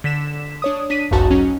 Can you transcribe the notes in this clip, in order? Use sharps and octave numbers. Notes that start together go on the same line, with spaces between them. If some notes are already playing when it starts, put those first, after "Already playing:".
D3 B6 E7
D4 C#5 D#6
D4 B6 D#7
G#1 C#2 F#2 D#4 F#4 A5
F#3 C#4 D#4